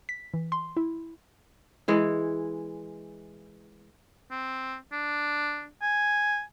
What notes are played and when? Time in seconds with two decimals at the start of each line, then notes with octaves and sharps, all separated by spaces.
0.09 B6
0.34 E3
0.52 C6
0.77 E4
1.88 E3 G#3 E4
4.31 C4
4.92 D4
5.82 G#5